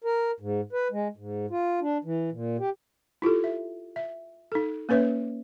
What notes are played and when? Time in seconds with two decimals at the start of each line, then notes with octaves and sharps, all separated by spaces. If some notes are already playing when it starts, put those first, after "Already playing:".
0.04 A#4
0.40 G#2
0.73 B4
0.91 G#3
1.17 G#2
1.51 F4
1.81 D4
2.04 E3
2.32 A#2
2.59 G4
3.22 E4 F4 G4 A4
3.44 E5
3.96 E5
4.52 D#4 A4
4.89 A#3 C#4 B4 C#5 E5